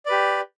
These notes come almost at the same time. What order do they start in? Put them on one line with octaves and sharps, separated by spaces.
D5 B4 G4